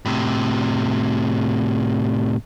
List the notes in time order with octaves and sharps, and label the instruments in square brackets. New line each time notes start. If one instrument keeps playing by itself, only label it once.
[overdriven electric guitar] A2 C3